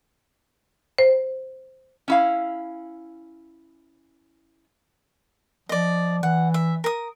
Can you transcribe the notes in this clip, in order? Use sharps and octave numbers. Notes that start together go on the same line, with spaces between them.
C5
C#4 E4 F5
F3 D5 D#5
E3 F#5
E5
A#4 D#6